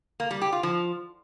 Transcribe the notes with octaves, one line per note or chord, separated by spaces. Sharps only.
A#3
G3
G4
F4
F3